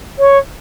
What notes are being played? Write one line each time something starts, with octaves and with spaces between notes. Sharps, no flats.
C#5